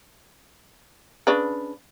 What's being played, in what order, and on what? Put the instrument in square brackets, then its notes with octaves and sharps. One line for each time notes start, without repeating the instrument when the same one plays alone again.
[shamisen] C#3 D4 B4